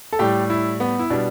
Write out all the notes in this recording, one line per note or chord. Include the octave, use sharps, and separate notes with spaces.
A4
A2 G3 G4
E4
B3
E4
B2 G3 D4